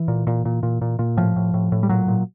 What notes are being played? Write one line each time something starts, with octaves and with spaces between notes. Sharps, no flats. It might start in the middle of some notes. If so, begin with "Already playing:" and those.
Already playing: E3
A#2
A#2
A#2
A#2
A#2
A#2
A2 F3
A2
A2
A2
G3
A#2 F#3
A#2